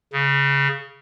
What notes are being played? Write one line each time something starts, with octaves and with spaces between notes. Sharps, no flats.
C#3